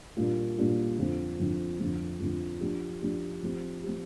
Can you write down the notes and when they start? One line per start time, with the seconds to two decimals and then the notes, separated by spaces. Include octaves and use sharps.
0.16 A#2 G3 A#3 D4 F4
0.57 A#2 G3 A#3 D4 F4
0.98 F2 D3 F3 C4
1.39 F2 D3 F3 C4
1.80 F2 D3 F3
2.20 F2 D3 F3
2.61 F3 D4 G4
3.02 F3 D4 G4
3.43 F3 C4 G4
3.84 F3 C4 G4